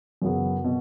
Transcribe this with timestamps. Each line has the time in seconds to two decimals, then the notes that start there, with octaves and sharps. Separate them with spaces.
0.22 F#2 C#3 F#3 B3
0.64 B2